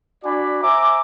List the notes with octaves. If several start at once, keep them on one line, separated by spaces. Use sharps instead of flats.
D4 F#4 D5 G#5 B5 D6
C5 E5 G#5 A#5 D6